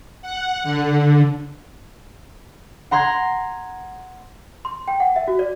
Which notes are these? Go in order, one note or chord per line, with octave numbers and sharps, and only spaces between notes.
F#5
D3
F#5 A#5 C6 F#6 G#6
C6
G5
F#5
E5
F#4
D5